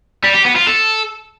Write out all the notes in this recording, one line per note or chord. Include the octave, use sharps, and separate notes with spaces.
G3
G4
B3
F4
A4